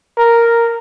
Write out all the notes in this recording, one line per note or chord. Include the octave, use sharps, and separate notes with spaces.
A#4